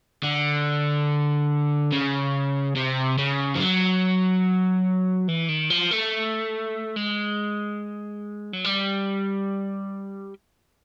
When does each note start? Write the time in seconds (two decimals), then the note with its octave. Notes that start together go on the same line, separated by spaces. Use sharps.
0.24 D3
1.92 C#3
2.76 C3
3.18 C#3
3.56 F3
3.61 F#3
5.29 E3
5.49 D#3
5.70 F3
5.91 A3
6.96 G#3
8.53 F#3
8.65 G3